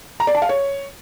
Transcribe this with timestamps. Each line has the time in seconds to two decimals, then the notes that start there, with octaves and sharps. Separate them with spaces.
0.20 A#5
0.27 D5
0.35 A5
0.42 F5
0.49 C#5